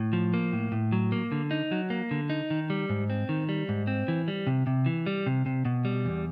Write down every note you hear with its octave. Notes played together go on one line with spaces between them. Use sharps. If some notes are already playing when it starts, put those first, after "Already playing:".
Already playing: A2
F3
A#3
A2
A2
F#3
A#3
D3
D#4
F#3
A#3
D3
D#4
D#3
G3
G#2
C4
D#3
G3
G#2
C4
E3
G3
C3
C3
E3
G3
C3
C3
B2
G3
E2